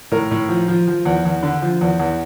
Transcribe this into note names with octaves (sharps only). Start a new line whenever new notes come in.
A2 A#4
A2
F3
F3
F3
E2
E2
D3
F3
E2
E2